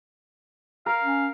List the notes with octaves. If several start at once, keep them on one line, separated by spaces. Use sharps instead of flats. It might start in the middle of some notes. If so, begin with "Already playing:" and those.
A#4 F5
C#4